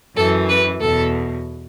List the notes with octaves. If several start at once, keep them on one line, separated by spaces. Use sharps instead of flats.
F#2 E3 A4
B4
E2 B2 A4